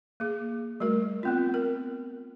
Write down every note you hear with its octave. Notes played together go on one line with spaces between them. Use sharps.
A#3 G#4
G3 A3 F#4 A#4
B3 C4 F4
A#4